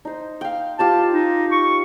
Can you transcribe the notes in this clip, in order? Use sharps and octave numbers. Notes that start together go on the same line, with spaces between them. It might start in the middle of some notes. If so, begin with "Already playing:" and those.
D#4 C5
F5 G5
F4 G4 C5 A5
D#4
C#6